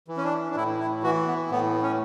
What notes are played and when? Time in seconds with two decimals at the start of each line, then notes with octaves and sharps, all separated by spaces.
0.08 E3
0.17 C#4
0.24 D4
0.51 D4
0.56 A2 E4
0.80 E4
1.03 E3 F#4
1.27 B3
1.51 A2 B3
1.82 C#4